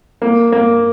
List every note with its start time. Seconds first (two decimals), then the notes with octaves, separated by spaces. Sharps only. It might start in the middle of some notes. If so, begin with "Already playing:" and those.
0.22 A#3
0.52 A#3